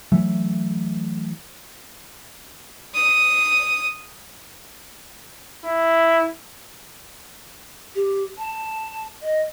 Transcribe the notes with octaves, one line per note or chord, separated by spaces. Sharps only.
E3 F#3 A3
D#6
E4
G4
A5
D#5